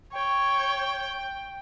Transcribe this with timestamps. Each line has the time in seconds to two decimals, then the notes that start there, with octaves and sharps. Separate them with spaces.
0.13 C#5 G5